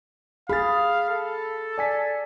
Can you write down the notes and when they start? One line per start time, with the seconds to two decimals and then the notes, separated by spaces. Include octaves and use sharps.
0.49 G#4 F5 B5 A6
1.09 A4
1.78 D5 G#5 B6